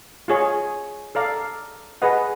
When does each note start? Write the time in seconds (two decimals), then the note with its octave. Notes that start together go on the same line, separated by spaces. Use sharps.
0.28 F4 G#4 C#5
1.15 A4 D5 F5 A#5
2.02 G#4 B4 D#5 F#5